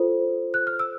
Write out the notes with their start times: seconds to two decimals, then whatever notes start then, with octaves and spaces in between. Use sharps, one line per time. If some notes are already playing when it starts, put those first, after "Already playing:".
Already playing: F4 A4 C5
0.54 F#6
0.67 F6
0.79 E6